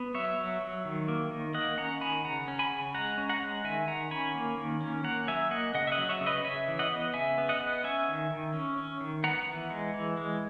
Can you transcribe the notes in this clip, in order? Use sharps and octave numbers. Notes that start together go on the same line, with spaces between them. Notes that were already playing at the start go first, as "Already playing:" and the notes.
Already playing: B3
F#3 C#5 E5
F#3
F#3
D#3
A#3
D#3
A#3 D#5 F#5
C#4 F#5 A#5
D#3 G#5 B5
C#3 F#5 A#5
C#4
G#5 B5
C#3
G#3 F#5 A#5
C#4
F#5 A#5
G#3
D#3 E5 G#5
D#3 F#5 A#5
C#4 G#5 B5
A#3
D#3
C#4
A#3 F#5 A#5
F#3 E5 G#5
A#3 D#5 F#5
C#3 D#5 F#5
E5
D#5 F#5
F#3
C#5 E5
C#3
B4 D#5
C#3 C#5 E5
E3
D#5 F#5
B3
C#3 E5 G#5
B3
D#5 F#5
B3
C#4 E5 G#5
D#3
D#3
C#4
C#4
D#3
B3 F#5 A#5
E3
G#3
E3
G#3